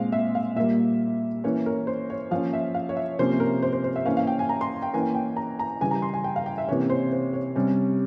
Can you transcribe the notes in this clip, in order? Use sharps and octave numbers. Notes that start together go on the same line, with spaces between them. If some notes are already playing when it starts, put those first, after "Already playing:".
Already playing: A#2 G#3 C4 F5
E5
F5
A#2 G3 A#3 E5
E3 A#3 C#4 C#5
A#4
C5
C#5
F3 A#3 C#4 F5
E5
F5
C#5
E5
C3 F3 A#3 C#4 C5
A#4
C5
C5
C5
E5
E3 A#3 C#4 F5
F5
G5
G#5
A#5
C6
G5
E3 A#3 C#4 G#5
G5
A#5
A#5
C#3 E3 G3 G#5
A#5
C6
G#5
G5
F5
G5
E5
C3 E3 A#3 C#4 C#5
C5
C5
C#5
C3 G3 C#4